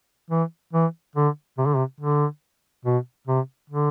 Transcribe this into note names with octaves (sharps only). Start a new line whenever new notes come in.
E3
E3
D3
C3
D3
C3
D3
B2
C3
D3